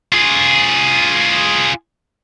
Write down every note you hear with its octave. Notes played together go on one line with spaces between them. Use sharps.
F4 G#4